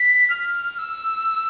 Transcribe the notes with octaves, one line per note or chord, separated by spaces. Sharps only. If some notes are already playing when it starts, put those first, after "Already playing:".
Already playing: B6
F6
E6